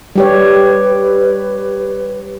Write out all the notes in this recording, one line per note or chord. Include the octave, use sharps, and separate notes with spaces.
G3 G4 B4 C#5